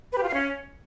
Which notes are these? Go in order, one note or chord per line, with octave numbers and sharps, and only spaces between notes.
B4
G4
F4
F5
C#4